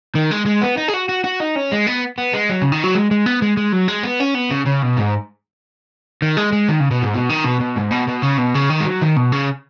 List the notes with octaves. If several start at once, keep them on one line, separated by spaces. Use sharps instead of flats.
D#3
G#3
G#3
B3
D#4
G#4
F#4
F#4
F#4
D#4
C#4
G#3
B3
B3
G#3
F#3
C#3
D#3
F#3
G#3
G#3
B3
G#3
G#3
F#3
G#3
B3
C#4
B3
C#3
C#3
B2
G#2
D#3
G#3
G#3
D#3
C#3
B2
G#2
B2
D#3
B2
B2
G#2
B2
B2
C#3
B2
C#3
D#3
G#3
F#3
D#3
B2
C#3